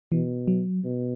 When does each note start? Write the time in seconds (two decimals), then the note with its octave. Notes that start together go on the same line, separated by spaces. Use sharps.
0.12 B2 E3
0.48 F#3
0.84 B2